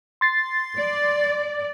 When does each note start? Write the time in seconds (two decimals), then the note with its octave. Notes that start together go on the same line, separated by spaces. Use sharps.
0.21 C6 A6 C7
0.78 D5